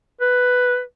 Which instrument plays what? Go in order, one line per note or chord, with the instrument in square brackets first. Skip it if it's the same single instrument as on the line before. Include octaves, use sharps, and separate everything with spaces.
[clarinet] B4